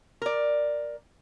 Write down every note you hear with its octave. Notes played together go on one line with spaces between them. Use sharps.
A#4 D5